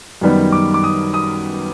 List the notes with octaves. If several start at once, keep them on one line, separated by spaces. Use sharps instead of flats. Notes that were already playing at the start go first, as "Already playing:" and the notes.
F#2 D#3 G3 B3
D6
D6
D#6
D#6